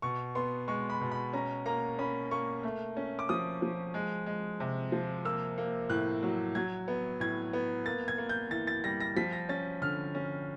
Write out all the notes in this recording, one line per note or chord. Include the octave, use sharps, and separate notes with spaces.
B2 C#6
B3 C6
G#3 C#6
B5
B2
B5
C#4 A#5
A#3 A#5
C#4 B5
A#3 C#6
A3
C#4
D6
F3 D#6
F3
G#3
G#3
C3
F3
A#3 E6
A#3
A2 F#6
F#3
F#3 G#6
B3
A2 G#6
B3
A#3 A6
G#6
A#3
G6
E3 A6
A6
G3 A#6
A#6
F3 B6
A#6
C#4 A6
D3 F6
C#4